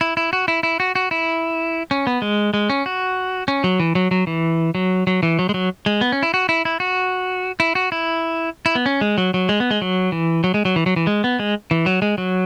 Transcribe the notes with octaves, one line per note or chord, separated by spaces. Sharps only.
E4
E4
F#4
E4
E4
F#4
F#4
E4
C#4
B3
G#3
G#3
C#4
F#4
C#4
F#3
E3
F#3
F#3
E3
F#3
F#3
E3
F#3
G#3
F#3
G#3
B3
C#4
E4
F#4
E4
E4
F#4
E4
F#4
E4
E4
B3
C#4
G#3
F#3
F#3
G#3
B3
G#3
F#3
E3
F#3
G#3
F#3
E3
F#3
E3
G#3
B3
G#3
E3
F#3
G#3
F#3